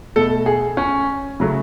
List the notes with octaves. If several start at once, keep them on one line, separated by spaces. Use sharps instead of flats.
B2 A3 A4
G#4
C#4
C#3 F#3 A3